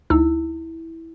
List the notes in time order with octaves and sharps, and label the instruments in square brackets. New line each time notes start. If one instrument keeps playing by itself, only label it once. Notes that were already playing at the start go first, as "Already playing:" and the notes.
[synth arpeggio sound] D2 D#4 E6 [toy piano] E4